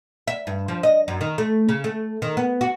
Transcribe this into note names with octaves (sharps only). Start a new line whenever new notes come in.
E5
G2
F3
D#5
F#2
D#3
A3
C#3
A3
D#3
B3
F#4